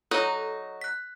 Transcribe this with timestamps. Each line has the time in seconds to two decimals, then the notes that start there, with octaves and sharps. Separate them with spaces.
0.11 F#3 D#4 A4
0.81 F#6 B6